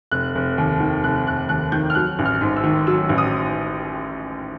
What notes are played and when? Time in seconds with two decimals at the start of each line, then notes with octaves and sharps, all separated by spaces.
0.12 F1 F#6
0.35 F1
0.58 D#2
0.80 D#3
1.04 F1 F#6
1.26 F1 F#6
1.49 D#2 F#6
1.72 D#3 G6
1.90 F6
1.95 F#3 F#6
2.19 A1
2.26 F6
2.41 G#2
2.57 E6
2.64 D#3
2.87 F#3 E6
3.09 A1
3.18 D#6